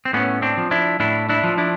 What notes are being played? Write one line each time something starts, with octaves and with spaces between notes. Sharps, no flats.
C4
A2 B3 C#4
C4 D4
F3
D4 E4
A2 D4 E4
D4 E4
F3
D4 E4